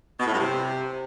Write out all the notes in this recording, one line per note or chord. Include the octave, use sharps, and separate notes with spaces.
B2
A2
G2
C3